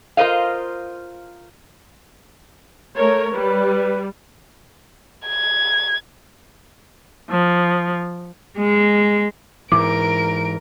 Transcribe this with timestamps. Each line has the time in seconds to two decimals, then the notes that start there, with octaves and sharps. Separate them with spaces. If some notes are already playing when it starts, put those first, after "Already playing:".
0.17 F4 A#4 C5 D#5 F5
2.97 A3 A#4 C#5
3.32 G3 B4
5.27 G#6
7.30 F3
8.59 G#3
9.72 G#2 E3 A#4 D6 D7